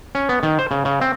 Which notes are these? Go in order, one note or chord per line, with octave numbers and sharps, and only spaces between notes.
C#4
B3
D#3
C5
C#3
C#3
C4